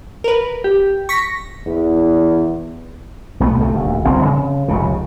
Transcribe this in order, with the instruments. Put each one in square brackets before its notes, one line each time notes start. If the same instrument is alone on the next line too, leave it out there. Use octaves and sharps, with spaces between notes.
[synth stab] A#4 B4
[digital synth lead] G4
[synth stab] C#6 B6 [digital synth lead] A#6
[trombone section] E2
[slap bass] B1 A3 B3
C#2 C3 A3
D#1 D2
G1 C2 C#3 C4
C#3
F1 C#2 C#3